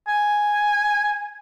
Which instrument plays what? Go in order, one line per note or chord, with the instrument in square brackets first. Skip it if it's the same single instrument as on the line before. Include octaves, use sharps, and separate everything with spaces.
[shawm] G#5